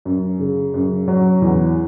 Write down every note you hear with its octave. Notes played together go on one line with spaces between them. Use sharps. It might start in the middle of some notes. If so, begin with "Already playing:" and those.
F#2
C#3
F#2
F#3
E2